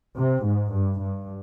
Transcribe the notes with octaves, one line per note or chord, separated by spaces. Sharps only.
C3
G#2
G2
G2